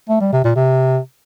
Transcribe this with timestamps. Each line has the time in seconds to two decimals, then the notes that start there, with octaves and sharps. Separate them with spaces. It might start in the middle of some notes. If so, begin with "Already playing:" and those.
0.09 A3
0.21 G3
0.33 C3
0.44 A#2
0.56 C3